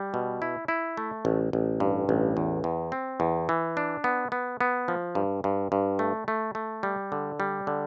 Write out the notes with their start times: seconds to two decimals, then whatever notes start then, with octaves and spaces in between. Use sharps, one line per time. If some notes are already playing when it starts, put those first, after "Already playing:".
Already playing: G3
0.14 B2
0.42 E4
0.68 E4
0.97 A3
1.25 A1
1.53 A1
1.80 G2
2.09 A1
2.37 E2
2.64 E2
2.92 C4
3.20 E2
3.49 E3
3.77 D4
4.04 B3
4.32 B3
4.61 B3
4.88 F3
5.15 G2
5.44 G2
5.72 G2
5.99 A3
6.28 A3
6.55 A3
6.83 G3
7.12 D3
7.40 G3
7.67 D3